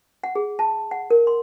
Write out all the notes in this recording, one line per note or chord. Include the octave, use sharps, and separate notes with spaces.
F#5
G#4
A5
F#5
A#4
C6